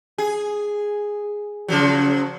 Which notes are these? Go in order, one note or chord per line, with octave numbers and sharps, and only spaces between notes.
G#4
C#3 F3 F#3